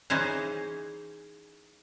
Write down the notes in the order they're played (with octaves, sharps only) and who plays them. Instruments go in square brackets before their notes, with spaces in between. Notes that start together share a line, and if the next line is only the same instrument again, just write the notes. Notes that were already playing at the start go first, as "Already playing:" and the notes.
[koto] E3 C#4 D#4 G#4 C5